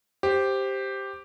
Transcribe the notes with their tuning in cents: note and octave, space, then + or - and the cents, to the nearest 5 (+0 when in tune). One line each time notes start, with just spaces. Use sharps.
G4 +0 C5 +0